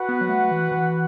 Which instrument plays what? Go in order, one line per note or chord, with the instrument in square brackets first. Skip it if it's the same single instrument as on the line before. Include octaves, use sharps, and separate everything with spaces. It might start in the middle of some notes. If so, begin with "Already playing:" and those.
Already playing: [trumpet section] F#4 B4 F#5
[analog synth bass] B3
F#3
A3
E3
E3